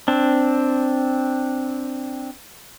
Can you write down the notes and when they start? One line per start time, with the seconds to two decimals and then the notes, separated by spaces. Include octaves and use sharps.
0.08 C4 D4